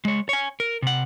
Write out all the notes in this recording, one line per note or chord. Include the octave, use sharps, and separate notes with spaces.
G#3 C#5
C#5 G#5
A#4
C3 F#5